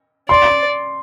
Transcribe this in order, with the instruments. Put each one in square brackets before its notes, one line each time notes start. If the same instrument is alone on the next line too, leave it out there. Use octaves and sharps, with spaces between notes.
[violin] D5 [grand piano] C6